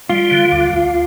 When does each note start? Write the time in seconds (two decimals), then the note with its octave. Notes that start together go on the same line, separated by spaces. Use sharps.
0.09 G3 F4
0.31 D3
0.52 D2
0.73 D2